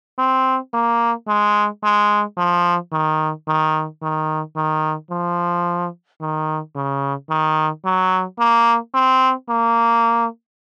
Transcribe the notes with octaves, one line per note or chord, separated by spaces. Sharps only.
C4
A#3
G#3
G#3
F3
D#3
D#3
D#3
D#3
F3
D#3
C#3
D#3
F#3
A#3
C4
A#3